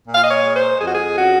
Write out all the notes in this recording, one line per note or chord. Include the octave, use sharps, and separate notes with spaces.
A#2
F5
D#5
C#5
G#3
C5
F2 G#4
F#4
G#4
C#4 F#4